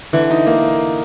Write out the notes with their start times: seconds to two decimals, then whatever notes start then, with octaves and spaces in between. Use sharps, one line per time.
0.13 D3 E3
0.31 D#4
0.47 A#3